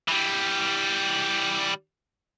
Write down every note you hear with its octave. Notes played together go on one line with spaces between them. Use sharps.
E3 G3